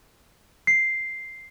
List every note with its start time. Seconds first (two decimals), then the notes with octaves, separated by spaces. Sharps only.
0.67 C7